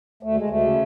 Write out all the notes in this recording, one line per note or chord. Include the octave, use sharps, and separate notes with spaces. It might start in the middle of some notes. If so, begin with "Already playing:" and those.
D2 A3
G#3
D2
A3
C#3